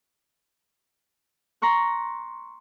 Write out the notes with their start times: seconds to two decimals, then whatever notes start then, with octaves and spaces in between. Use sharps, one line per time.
1.62 A#5 C6 C#6 F#6